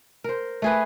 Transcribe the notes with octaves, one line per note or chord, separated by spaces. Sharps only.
A#4 C5
A3 G#4 B4